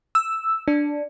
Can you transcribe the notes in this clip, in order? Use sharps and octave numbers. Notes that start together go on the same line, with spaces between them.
E6
D4